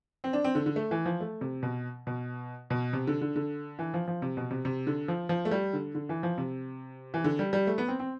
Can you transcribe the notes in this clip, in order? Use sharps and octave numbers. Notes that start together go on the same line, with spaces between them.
C4
D4
C4
D3
D3
A3
E3
F3
A3
C3
B2
B2
B2
C3
D3
D3
D3
E3
F3
F3
C3
B2
C3
C3
D3
F3
F3
A3
G3
D3
D3
E3
F3
C3
E3
D3
G3
G3
A3
B3
C4
C4